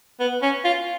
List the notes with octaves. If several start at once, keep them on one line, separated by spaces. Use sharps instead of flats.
B3
C#4
F4